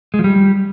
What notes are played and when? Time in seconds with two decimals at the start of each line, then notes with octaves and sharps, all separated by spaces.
0.14 G#3
0.19 F3
0.24 G3